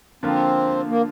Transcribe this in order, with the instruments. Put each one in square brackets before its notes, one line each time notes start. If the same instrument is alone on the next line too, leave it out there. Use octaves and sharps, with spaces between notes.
[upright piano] D3 F3 A#3 F4 [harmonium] C4
[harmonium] A#3